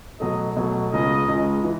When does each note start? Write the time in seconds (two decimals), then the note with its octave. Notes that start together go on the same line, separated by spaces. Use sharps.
0.20 B2 F#3 A3 D#5
0.57 B2 F#3 A3
0.92 C#2 C#3 G#3 D#5
1.28 C#2 C#3 G#3
1.64 E3